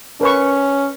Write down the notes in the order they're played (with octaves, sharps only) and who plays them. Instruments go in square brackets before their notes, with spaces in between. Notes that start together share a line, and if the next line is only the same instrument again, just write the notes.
[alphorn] C#4 [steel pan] A#4 B4 C#6